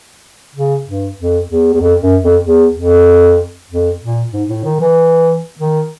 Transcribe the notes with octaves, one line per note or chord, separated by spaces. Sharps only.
C#3
G2
F2
E2
E2
F2
F#2
F2
E2
F2
F2
A#2
G#2
A2
D#3
E3
D#3